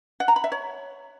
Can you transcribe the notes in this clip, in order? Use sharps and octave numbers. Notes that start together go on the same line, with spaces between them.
F#5
A#5
B5
E5
C#5